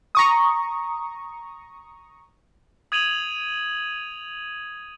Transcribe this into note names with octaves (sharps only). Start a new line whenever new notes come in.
A#5 C#6 D#6
D#6 G#6 D#7 F7 F#7